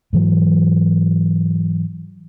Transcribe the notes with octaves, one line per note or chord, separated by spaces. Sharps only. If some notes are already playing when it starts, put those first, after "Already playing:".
G#2 E3 F#3